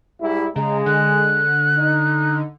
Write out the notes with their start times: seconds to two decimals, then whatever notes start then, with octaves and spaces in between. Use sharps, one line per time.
0.21 G#2 G3 E4
0.56 C#3 G#3 A#5
0.86 D3 F#6
1.78 D#4